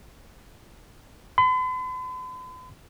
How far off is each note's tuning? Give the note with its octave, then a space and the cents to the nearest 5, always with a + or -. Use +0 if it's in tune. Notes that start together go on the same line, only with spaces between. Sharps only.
B5 +45